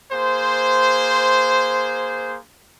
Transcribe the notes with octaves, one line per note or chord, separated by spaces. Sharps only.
A#3 G#4 C5